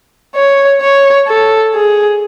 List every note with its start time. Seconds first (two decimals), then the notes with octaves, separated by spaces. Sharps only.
0.35 C#5
0.81 C#5
1.28 A4
1.74 G#4